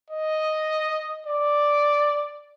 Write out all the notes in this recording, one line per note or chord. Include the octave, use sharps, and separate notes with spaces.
D#5
D5